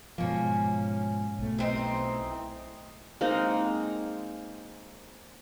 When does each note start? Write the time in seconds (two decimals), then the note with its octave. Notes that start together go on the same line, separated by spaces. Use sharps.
0.18 G#2 B2 F3 A#3 C#4
1.39 B1 A3
1.59 E3 C4 D#4
3.21 G#3 A#3 C4 D#4